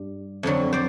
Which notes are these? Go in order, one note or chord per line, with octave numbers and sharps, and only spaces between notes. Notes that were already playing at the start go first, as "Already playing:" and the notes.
Already playing: G2
F2 D3 F#3
C5 D5